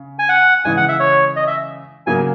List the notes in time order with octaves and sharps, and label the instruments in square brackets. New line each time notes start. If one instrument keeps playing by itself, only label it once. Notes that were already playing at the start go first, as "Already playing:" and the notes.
Already playing: [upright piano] C#3
[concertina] G#5
F#5
[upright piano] C#3 E3 G#3 [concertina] G#5
[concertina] F#5
E5
C#5
D#5
E5
[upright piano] C#3 F#3 A#3 [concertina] G#5